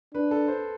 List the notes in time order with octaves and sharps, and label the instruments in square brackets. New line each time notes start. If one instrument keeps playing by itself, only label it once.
[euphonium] D4 [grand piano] B4
[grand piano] A4
C5